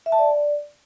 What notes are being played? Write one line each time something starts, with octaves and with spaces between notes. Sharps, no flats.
E5
A5
D5